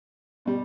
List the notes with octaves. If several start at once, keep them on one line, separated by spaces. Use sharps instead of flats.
B2 G3